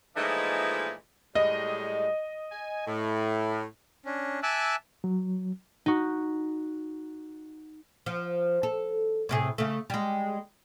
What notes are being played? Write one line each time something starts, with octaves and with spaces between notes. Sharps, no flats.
A#2 E3 F3 G#3 A3 D#4
A2 G3 G#3 D#5
G#5
A2
C#4 D4
E5 G#5 A5 D6 E6 F#6
F#3
D#4 F#4
F3
A4
A2 C3 G#4
C#3 A3
G3 G#3